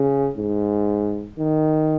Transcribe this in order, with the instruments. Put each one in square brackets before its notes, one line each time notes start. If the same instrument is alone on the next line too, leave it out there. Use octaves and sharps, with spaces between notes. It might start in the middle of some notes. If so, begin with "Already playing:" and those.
Already playing: [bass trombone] C#3
G#2
D#3